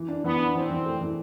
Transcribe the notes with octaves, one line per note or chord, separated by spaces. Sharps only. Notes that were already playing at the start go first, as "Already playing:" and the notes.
Already playing: E3
D4
E3 B3
D4
E3 C4
E3
A3
E3